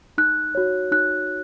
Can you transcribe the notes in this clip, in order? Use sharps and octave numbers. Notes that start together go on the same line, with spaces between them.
D#4 F#6
F#4 C#5
D#4 F#6